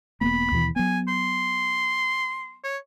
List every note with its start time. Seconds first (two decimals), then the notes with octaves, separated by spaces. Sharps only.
0.21 E1 A#3 B3 B5
0.52 D#2 B2 E3
0.76 F#3 B3 G#5
1.08 C6
2.64 C#5